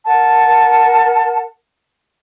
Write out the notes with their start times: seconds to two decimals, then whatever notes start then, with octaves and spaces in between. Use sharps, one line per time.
0.05 A#4 F#5 A5